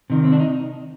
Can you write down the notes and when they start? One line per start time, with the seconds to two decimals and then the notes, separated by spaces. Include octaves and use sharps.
0.10 C3 D#3
0.24 C4
0.32 D4
0.40 D#4